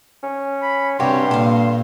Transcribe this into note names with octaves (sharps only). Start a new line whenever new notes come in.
C#4
B5
G2 C3 F#4 G4 C#5 C6
A#2 A4 F5